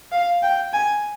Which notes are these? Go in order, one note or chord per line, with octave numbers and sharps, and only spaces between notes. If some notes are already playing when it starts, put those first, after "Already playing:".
F5
G5
G#5